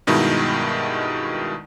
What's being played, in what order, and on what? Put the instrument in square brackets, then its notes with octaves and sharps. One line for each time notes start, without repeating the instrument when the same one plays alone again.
[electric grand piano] G2 B2 D#3 G#3 D#4 E4